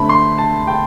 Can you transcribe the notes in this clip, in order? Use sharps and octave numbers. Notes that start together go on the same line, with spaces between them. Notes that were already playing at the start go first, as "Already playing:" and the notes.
Already playing: D3 A3 C4 B5
C6
A5
G5